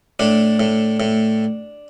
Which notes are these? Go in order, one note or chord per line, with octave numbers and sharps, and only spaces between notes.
A2 D4
A2
A2